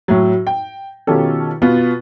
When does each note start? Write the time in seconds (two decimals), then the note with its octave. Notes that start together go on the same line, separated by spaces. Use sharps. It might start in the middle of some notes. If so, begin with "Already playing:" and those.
0.08 A2 F#3
0.47 G5
1.07 B2 D#3 C#4 F4 G4 A4
1.62 B2 B3 F4